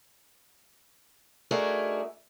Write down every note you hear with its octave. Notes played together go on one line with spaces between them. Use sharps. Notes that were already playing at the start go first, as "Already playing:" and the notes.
A3 D4 D#4 F#4 G#4 A#4